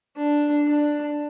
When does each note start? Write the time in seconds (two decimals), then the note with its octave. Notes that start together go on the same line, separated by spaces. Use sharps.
0.16 D4
0.66 D4